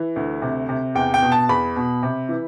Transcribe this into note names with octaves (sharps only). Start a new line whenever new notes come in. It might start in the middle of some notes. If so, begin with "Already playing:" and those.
Already playing: E3
D2
C3
C3
E2 G5
G5
B2
A5
E2 B5
B2
C3
E3